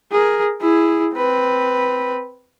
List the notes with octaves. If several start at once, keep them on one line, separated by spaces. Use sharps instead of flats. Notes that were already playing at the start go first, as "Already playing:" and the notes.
G#4 A#4
E4 G#4
C4 B4